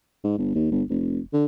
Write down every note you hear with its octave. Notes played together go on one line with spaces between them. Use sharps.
G#2
G1
D#2
G1
F1
D3